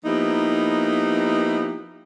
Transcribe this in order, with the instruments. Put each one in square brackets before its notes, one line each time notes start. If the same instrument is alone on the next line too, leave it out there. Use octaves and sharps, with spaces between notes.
[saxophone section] F3 A#3 B3 D#4 E4 G4